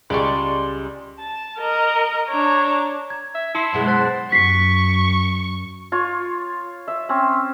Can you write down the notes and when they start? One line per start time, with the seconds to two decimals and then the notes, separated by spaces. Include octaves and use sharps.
0.10 C#2 G3 G#3 D5 C6 C#6
1.18 A5
1.59 A#4 D#5 A#5
2.27 D4 C#5 A#5
3.10 G#6
3.35 E5
3.55 E4 A5 C6 C7
3.73 F#2 B2 G#3
3.87 C5 F#6 A6 B6
4.32 F#2 C#6 B6 C7
5.92 F4 C#5
6.88 E5
7.09 C4 C#4